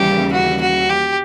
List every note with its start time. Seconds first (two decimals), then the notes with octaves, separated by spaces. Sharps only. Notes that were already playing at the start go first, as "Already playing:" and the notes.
Already playing: D#2 C#3 E3 G3 A#3 G4
0.32 F#4
0.61 F#4
0.90 G4